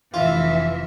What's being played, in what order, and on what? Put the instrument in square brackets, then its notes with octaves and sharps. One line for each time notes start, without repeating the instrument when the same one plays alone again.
[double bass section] F1 [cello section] E3 E5 [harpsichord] F4